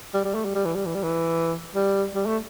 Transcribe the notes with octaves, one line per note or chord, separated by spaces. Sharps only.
G3
G3
A3
G3
G3
E3
G3
E3
G3
E3
G3
G3
A3